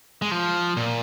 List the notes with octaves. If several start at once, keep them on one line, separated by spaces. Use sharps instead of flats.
G#3
F3
A#2